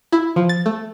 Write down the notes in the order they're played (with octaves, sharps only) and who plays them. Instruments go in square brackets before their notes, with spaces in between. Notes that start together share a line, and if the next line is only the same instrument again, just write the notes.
[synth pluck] E4
F3
A6
A3